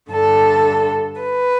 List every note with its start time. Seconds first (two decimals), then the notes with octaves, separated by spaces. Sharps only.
0.12 G2 D3 A4
1.22 B4